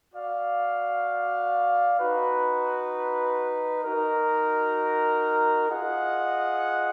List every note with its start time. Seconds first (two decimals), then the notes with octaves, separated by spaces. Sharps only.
0.14 F#4 D5 F5
1.99 D#4 F#4 B4
3.84 D#4 F#4 A#4
5.69 F4 G#4 D#5 F#5